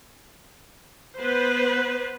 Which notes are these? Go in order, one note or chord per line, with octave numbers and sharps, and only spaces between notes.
B3 B4 C5